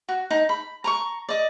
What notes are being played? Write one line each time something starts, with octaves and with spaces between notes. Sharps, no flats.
F#4
D#4
B5
A#5 C6 C#6
D5 D#5